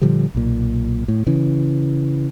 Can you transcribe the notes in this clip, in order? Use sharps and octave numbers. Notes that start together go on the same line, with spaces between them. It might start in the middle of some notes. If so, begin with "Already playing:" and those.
A#2 D3 F3 G3
B1 A#2
A2
C#3 E3